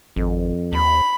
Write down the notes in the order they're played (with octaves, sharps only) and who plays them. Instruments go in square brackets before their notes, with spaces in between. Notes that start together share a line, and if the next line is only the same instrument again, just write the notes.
[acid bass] G#1 [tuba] F2
[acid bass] D#2 [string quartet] B5